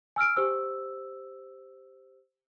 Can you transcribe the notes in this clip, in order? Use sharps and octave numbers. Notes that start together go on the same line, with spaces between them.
G#5 E6 F6 D7
G4 C5 E6